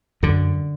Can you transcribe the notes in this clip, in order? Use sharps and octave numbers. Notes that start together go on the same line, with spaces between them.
F#2 D3